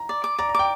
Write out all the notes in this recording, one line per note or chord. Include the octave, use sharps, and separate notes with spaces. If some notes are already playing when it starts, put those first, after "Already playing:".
Already playing: A#5
D5
D6
D5 A#5
A#5
G5 D6